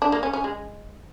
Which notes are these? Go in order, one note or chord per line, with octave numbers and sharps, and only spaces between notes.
D4
A#3
C#4
C#4
G#3